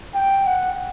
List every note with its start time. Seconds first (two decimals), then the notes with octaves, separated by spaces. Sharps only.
0.15 G5
0.45 F#5